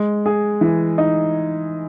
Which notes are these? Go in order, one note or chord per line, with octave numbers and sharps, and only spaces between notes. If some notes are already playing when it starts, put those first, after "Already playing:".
Already playing: G#3
G#4
E3
D#4